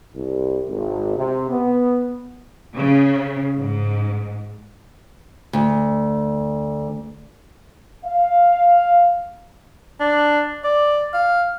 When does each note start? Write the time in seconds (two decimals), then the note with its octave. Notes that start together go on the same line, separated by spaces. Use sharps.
0.15 C2
0.67 G#1
1.17 C3
1.49 B3
2.77 C#3
3.60 G#2
5.53 D2
8.05 F5
10.00 D4
10.64 D5
11.14 F5